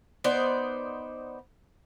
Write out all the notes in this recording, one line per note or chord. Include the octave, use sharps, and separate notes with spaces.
B3 D#4 C5 D5